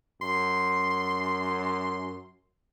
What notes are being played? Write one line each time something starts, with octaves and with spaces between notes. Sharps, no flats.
F#2 C6